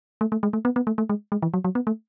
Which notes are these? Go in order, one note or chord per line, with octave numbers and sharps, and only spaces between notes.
A3
A3
G#3
A3
B3
B3
A3
A3
G#3
G#3
E3
F#3
F#3
B3
A3